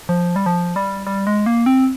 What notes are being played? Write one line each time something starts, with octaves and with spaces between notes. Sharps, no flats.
F3
G3
F3
G3
G3
G#3
A#3
C4